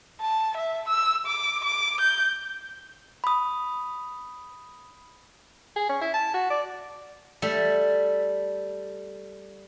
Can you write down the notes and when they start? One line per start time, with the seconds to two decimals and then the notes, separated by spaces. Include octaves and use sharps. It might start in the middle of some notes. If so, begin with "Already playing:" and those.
0.21 A5
0.58 E5
0.89 E6
1.27 D6
1.65 D6
2.01 G6
3.24 B5 D#6
5.76 G#4
5.89 C#4
6.01 E4
6.14 A5
6.34 F#4
6.50 D5
7.42 G3 A3 E5